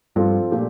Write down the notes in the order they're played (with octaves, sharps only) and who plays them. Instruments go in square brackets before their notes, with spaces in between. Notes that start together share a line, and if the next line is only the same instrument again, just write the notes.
[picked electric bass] G2 [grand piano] F3 C4 F4 A4
[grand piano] A#2 A3 D4 G4